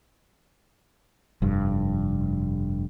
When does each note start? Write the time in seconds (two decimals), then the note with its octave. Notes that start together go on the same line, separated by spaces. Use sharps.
1.42 F1 G2